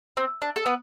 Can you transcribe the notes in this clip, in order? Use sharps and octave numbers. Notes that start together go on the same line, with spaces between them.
C4
D4
A4
B3 B4